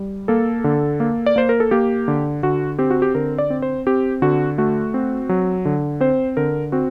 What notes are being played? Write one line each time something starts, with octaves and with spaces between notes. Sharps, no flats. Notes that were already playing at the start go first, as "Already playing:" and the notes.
Already playing: G3
A#3 A4
D3
A#3
D5
A#3 C5
A#4
A4
A#3 G4
D3
D3 F#4
C4 G4
F#4
G4
D3 A#4
D5
C4
C5
C4 G4
D3 F#4
A3 F#4
C4
F#3
D3
C4 C5
D3 A#4
C4 F#4